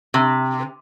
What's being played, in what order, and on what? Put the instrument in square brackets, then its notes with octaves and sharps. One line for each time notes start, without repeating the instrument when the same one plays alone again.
[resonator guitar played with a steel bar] C3